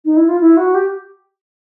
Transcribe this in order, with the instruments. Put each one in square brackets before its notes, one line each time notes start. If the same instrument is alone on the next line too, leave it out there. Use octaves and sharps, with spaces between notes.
[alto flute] D#4
E4
F4
E4
F#4
G4